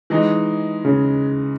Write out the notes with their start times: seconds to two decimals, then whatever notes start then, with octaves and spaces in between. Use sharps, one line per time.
0.10 E3 G#3 D#4
0.85 C#3